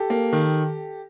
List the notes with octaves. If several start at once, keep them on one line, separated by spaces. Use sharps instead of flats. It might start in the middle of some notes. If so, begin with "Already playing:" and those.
Already playing: G4 A4
A#3
D#3